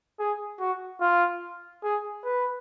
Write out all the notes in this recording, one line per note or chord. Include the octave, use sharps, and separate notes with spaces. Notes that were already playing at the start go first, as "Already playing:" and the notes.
G#4
F#4
F4
G#4
B4